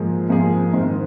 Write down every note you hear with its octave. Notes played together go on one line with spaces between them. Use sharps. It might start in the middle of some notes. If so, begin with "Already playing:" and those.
Already playing: G#2 F3 A#3 G#4
G#2 F3 A#3 G#4
G#2 D#3 C4